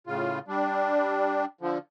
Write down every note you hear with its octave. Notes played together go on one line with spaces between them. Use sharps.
A2 C#3 F4
G3 D4
D3 F3